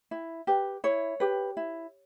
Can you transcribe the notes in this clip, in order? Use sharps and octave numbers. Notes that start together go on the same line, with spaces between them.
E4
G4 B4
E4 C#5
G4 B4
E4